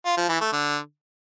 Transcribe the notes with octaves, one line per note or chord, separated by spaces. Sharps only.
F4
F3
E3
A3
D3